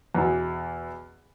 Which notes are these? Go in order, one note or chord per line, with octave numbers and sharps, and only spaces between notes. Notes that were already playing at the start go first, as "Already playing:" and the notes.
E2 B2 E3